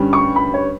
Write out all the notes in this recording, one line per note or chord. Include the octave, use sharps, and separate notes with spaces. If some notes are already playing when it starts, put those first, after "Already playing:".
Already playing: G2 D3 G3 C#4
C#6
B5
C#5